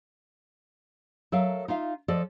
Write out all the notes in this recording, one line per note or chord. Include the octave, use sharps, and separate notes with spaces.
F#3 A4 A#4 E5 F5
D#4 F4 E5 F5
F3 A4 D5 D#5